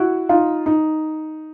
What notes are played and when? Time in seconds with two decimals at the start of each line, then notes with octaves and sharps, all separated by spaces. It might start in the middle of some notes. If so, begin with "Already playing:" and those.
Already playing: E4 F#4
0.29 D#4 F4
0.66 D#4